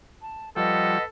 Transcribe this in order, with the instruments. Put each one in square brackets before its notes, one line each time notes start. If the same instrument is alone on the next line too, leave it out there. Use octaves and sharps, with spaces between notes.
[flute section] A5
[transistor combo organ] F3 G3 [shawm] A4 [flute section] B4 D#5 F#5